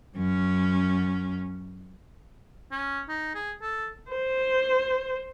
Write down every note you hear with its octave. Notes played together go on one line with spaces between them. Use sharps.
F#2 C#4
C#4
D#4
G#4
A4
C5